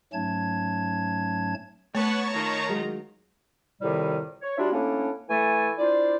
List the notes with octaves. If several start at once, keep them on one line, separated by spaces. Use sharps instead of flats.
G#2 F#3 A3 C#4 A5 G#6
A3 B3 C#5 F#5 A5 C#6
D#3 F4 A#5
F#3 G#3
F2 A2 C3 D#3 G3
C#5
G3 D4 F4 F#4 E5
A2 A#3 C#4 D4
E3 A3 A4 G#5
D4 E4 F4 C5 D5